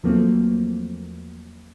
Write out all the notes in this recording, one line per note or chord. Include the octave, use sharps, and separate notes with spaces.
E2 F3 F#3 A3 A#3 C4